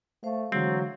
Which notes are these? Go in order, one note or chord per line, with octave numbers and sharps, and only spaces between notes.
A3 C5 F5
D3 E3 F#3 G#3 C4